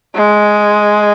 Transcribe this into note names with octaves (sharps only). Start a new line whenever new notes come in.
G#3